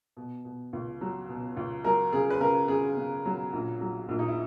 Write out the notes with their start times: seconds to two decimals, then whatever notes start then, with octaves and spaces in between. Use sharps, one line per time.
0.17 B2
0.45 B2
0.73 C#2
1.01 F#3
1.29 B2
1.57 C#2
1.84 F#3 A#4
2.13 C#3 G#4
2.30 B4
2.41 C#3 A#4
2.68 C#3 G#4
2.97 C#3
3.25 F#3
3.53 A#1
3.81 F#3
4.09 A#1
4.19 D#4
4.28 E4